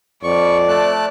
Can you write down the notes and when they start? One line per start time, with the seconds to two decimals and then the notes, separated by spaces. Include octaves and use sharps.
0.23 F2 D5 C#6
0.69 A3 A5 F#6